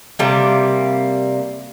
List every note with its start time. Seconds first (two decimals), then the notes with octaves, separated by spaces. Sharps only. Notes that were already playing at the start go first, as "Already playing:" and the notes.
0.19 C3 G3 A#3